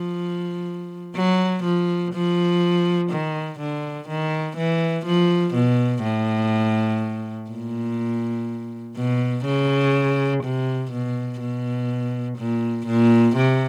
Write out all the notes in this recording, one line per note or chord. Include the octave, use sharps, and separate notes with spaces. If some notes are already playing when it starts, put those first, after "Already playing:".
Already playing: F3
F#3
F3
F3
D#3
D3
D#3
E3
F3
B2
A2
A#2
B2
C#3
C3
B2
B2
A#2
A#2
C3